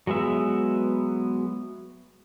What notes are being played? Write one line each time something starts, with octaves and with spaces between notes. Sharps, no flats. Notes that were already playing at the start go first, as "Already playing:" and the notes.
F#3 G#3 B3 E5